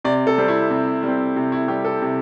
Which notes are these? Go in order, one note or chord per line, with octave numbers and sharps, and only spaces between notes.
C3 D5
A4
G3 C4
E4
C3
G3 C4
C3
E4
G3 C4 G4
A4
C3